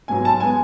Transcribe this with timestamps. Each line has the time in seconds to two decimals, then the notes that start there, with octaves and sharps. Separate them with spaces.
0.08 G#2 F#3 B3 G#5
0.25 A5
0.40 G#3 B3 G#5